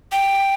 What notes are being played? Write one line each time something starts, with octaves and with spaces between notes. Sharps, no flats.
G5